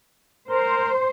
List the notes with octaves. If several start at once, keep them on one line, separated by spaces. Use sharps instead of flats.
A#4 C5